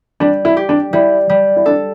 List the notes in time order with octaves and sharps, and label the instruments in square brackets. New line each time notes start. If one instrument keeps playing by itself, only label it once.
[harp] G3 [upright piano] D4
[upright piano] E4
[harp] G4
[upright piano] D4
[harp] G3 [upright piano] E4
[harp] G3
[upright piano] E4
[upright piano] D4 [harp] A4